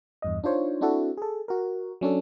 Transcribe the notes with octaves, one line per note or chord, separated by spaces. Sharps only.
E2 G2 D#5
D4 D#4 F4 C5 C#5
C4 D4 E4 F#4 A4
G#4 A4
F#4 A#4
F#3 C#4 D4 A4